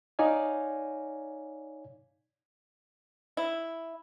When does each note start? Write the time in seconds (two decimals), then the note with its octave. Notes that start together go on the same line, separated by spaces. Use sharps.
0.19 D#4 C#5 D5 F5 G#5
3.37 E4